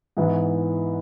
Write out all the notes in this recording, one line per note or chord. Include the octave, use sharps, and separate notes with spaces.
G#2 E3 B3 E4